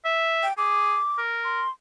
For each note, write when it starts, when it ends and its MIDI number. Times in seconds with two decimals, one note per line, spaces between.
0.05 0.45 76
0.43 0.53 79
0.58 0.97 68
0.58 1.18 86
1.18 1.62 70
1.44 1.69 84